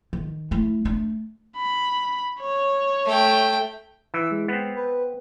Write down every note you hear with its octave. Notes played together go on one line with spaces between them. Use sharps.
D#3
A3 E4
A3 D4
B5
C#5
A3 G5
E3 E6
G#3
B3 C4
B4